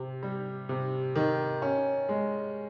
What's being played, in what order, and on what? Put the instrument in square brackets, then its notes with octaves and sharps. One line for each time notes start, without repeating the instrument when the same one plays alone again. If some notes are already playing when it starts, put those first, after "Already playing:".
Already playing: [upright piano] C3
G3
C3
D#3
C#4
G#3